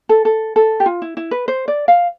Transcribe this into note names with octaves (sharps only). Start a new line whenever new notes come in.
A4
A4
A4
G4
F4
E4
E4
B4
C5
D5
F5